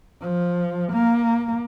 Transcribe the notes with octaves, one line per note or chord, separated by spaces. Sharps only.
F3
A#3